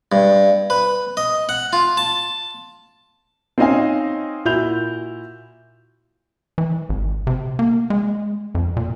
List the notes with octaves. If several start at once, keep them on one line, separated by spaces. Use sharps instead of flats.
G2
B4
D#5
F#5
F4
A5
C4 C#4 D#4 D#5 F5 G#5
A#2 E4 F#4 G6 F7
E3
G#1
C3
A#3
G#3
F2
A#2